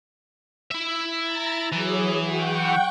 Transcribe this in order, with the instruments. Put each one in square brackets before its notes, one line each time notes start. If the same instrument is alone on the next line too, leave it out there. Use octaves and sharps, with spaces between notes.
[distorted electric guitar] E4 E5
[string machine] A#5 A6
[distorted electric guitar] E3 [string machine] F#3 G#4
[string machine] F#5 G5 C#6